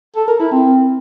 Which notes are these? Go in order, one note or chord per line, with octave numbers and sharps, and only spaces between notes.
A4
A#4
E4
C4